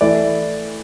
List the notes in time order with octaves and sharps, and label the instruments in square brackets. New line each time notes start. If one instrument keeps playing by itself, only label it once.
[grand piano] E3 A3 E4 D5